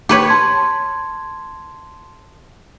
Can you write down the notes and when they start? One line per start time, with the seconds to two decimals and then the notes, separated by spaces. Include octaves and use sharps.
0.09 G4 B4 C#5
0.29 A5 C6 G#6